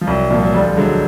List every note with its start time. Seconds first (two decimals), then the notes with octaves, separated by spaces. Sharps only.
0.01 F3
0.07 C2 F#3
0.31 A#2 F3
0.43 F#3
0.54 D2 F3 G3
0.67 G3
0.77 D3 F#3 G#3